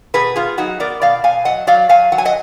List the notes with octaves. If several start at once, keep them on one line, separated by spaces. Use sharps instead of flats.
B2 G#4 B4
B3 F4 G#4
F#3 D#4 F#4
B3 A#4 D5
B2 D5 F5
B2 F5 G#5
F#3 D#5 F#5
F#3 D5 F5
F#3 F5 G#5
F#3 F#5
G#5
D#5 F#5